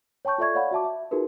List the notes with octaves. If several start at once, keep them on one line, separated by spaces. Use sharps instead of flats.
C#5 G5 A5 C#6 G6
F4 A4 D5 E5 C#6 G#6
C#5 D5 F5 F#5 B5
F#4 E5 A5 D6
E5
D#4 F4 F#4 G#4 A#4 B4